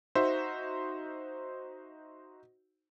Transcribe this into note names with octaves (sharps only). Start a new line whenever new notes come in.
D#4 F#4 C5 E5